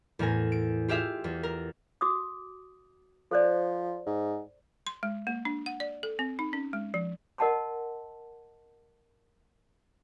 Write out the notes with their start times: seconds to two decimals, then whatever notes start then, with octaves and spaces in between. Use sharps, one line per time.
0.19 E2 A2 A#4 G#5 A#6
0.52 D7
0.88 F4 G4 G#4 E5 F5
1.24 E2
1.43 A#4
2.01 F#4 D6 D#6
3.31 F3 A4 C5 D5
4.07 G#2
4.87 C6
5.03 G#3
5.27 A#3
5.45 D4
5.66 F#5
5.80 D5
6.03 A4
6.19 C4
6.39 D#4
6.53 C#4
6.73 G#3
6.94 F3
7.38 A#4 D#5 F#5 A5 B5 C6